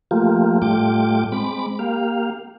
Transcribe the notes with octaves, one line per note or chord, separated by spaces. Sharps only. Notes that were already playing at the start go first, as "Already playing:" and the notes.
F3 A3 A#3 F4 G4
A2 G3 A3 F4 G5 D6
G#3 C4 B5 D6
A#3 G4 F5